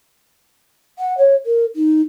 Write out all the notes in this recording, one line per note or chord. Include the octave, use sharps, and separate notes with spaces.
F#5
C#5
A#4
D#4